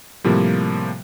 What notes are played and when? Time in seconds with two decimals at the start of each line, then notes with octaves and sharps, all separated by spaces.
0.24 A2 C3 F3 G3 A#3